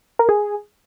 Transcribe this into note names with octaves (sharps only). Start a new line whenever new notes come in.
A#4
G#4